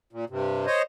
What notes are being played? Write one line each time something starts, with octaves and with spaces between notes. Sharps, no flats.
A#2
G2 C3
C5 C#5 D#5